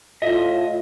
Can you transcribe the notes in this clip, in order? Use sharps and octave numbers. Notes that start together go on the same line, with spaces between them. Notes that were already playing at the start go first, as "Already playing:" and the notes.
A2 F4 D#5 E5